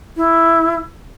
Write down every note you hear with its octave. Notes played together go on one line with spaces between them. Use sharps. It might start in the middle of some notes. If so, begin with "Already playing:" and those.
E4